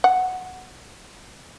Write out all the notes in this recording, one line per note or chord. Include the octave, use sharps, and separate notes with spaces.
F#5